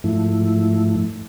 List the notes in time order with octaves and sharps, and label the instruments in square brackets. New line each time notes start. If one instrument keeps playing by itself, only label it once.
[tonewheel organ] G#2 F3 A3 E4